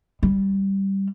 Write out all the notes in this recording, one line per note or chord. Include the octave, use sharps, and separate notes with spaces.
G3